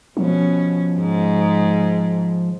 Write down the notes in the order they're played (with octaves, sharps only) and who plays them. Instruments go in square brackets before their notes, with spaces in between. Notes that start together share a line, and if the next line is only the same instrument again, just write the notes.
[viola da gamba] B2 C#4 [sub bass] F3
[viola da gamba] G#2